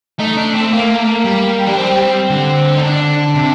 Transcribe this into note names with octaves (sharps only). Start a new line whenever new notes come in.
A3 D#4
D4
C4
A#3
G3
D4
C4
D3
D#4
D4
C3